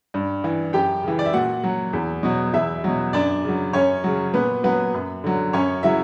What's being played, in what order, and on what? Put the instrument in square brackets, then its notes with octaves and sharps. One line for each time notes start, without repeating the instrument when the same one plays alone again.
[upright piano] G2
E3
F#2 G4 G5
C#3 E3
D5
E5
A#2 F#4 F#5
F#3
E2
B2 F#3
E2 E4 E5
B2 F#3
F#2 D4 D5
C#3 F#3
F#2 C#4 C#5
C#3 F#3
A#2 B3 B4
F#3 B3 B4
F#2
D3 F#3
F#2 C#4 C#5
C#3 F#3 E4 E5